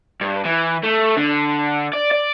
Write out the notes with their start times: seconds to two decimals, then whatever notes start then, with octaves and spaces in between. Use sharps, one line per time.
0.21 G2
0.45 E3
0.83 A3
1.17 D3
1.93 D5
2.11 D5